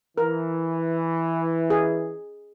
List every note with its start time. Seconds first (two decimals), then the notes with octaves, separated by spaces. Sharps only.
0.18 E3 A#4
1.70 G#4